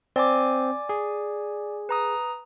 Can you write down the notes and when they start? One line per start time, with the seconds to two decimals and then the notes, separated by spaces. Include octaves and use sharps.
0.16 C4 D5 G#5 D6
0.89 G#4
1.89 B4 A#5 D#6